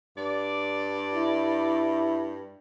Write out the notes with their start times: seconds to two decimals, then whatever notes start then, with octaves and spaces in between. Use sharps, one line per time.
0.17 G2 D5
1.15 E4